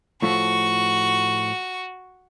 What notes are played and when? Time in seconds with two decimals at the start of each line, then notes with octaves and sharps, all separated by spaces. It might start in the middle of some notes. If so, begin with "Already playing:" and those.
0.22 A2 F3 A3 F#4 C#6